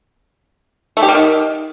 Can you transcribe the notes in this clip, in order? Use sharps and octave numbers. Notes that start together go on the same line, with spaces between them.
A3
G4
G3
D#3